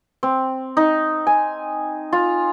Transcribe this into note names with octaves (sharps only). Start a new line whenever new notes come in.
C4
D#4
G#5
F4